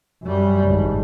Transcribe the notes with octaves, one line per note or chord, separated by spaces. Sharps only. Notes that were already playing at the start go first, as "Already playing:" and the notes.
F#2 G3
G#1